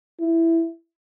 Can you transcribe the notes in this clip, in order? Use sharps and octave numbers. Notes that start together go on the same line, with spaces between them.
E4